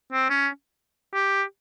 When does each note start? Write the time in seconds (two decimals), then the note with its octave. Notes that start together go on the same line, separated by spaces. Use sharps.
0.13 C4
0.30 C#4
1.14 G4